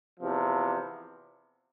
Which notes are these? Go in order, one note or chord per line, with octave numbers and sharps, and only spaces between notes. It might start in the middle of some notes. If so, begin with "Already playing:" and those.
E2 C3 F3